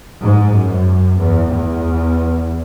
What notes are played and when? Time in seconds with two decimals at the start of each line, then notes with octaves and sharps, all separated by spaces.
0.20 G#2
0.52 F#2
1.17 E2
1.49 E2